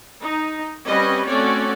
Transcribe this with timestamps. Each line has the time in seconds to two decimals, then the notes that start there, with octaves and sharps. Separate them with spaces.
0.23 D#4
0.87 G3 C4 C#4 F#4 B4 D#5
1.26 A3 C4 C#4 F#4 C#5 D5